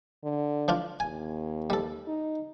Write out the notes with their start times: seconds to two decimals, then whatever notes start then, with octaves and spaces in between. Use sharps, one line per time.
0.24 D3
0.68 F3 D4 F4
1.00 D#2 G#5
1.70 G3 A4
2.07 D#4